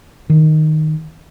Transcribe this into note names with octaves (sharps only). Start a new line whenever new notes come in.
D#3